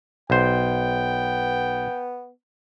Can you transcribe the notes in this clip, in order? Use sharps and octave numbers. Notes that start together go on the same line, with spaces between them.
B1 B3 C5 G5